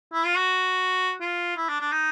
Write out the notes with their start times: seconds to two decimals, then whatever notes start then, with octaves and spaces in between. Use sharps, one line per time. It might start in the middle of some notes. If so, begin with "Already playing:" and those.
0.13 E4
0.25 F4
0.37 F#4
1.21 F4
1.57 E4
1.69 D4
1.81 D4
1.92 D#4